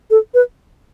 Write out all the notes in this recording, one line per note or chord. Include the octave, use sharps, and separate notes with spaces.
A4
B4